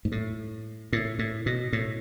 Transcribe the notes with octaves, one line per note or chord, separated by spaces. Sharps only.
G#2
A2
A2
A2
B2
A2